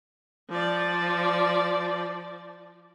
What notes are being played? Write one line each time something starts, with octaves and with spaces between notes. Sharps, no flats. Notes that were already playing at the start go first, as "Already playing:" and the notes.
F3 D5